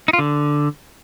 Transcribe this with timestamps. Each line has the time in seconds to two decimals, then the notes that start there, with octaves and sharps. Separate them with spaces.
0.08 D#4
0.13 F4
0.19 D3